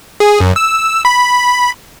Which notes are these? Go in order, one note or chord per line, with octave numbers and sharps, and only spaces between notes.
G#4
F#2
E6
B5